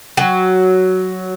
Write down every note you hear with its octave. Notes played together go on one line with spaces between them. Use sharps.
F#3